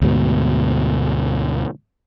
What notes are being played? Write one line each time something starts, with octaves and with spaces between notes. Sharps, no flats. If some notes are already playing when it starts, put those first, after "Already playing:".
D2 G#2 B2